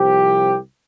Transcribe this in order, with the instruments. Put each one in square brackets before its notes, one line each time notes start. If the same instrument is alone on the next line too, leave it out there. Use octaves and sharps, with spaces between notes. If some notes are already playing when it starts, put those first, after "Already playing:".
Already playing: [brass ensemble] C2 C3 F3 C4 G4